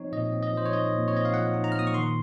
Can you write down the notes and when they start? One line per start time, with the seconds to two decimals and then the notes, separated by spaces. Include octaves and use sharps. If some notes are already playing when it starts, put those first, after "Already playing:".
Already playing: F3 C4 D#4 C#5
0.12 A#2 D#5
0.32 C4
0.43 D#5
0.53 F3 C5
0.66 C#5
0.73 D#4 D#5
0.93 A#2
1.08 C#5
1.13 C4 D#5
1.25 F5
1.33 F3 F#5
1.54 D#4
1.64 A#5
1.72 F6
1.74 A#2 D#6
1.87 C#6
1.94 D#3 C6